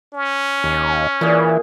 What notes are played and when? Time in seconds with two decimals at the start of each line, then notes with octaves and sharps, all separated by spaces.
0.14 C#4
0.64 D#2
1.21 A#2 E3 G#4